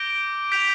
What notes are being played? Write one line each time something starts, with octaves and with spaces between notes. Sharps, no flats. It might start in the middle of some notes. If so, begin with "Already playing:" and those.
Already playing: D6 G6 A#6 D7 G7
G6 B6 D7 F7